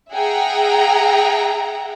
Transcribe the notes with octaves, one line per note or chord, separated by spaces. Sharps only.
G#4 E5 F#5 G5 A#5